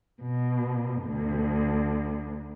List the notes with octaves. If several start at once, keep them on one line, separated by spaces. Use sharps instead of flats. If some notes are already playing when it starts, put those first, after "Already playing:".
B2
D2